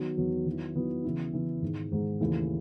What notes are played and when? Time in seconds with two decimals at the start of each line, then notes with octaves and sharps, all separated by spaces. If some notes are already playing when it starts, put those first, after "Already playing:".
Already playing: D#3 F#3 B3
0.17 E2 D#3 F#3 B3
0.46 D#3 F#3 B3 E4
0.75 D#3 F#3 B3 E4
1.04 C#3 E3 B3 E4
1.33 C#3 E3 B3 E4
1.62 G#2 D#3 G#3
1.92 G#2 D#3 G#3
2.20 D#2 C#3 E3 A3 E4